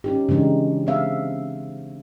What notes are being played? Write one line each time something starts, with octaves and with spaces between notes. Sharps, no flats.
C#4 D#4 G4
C#3 E3 G#3 D4 D#4
G#3 C4 E5 F5